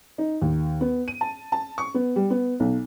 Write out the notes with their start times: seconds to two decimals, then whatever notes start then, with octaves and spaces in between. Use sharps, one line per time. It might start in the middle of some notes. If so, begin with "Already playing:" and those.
0.18 D#4
0.42 D#2
0.81 B3
1.08 D#7
1.21 A5
1.52 A5
1.78 C#6
1.94 B3
2.16 G3
2.30 B3
2.60 B1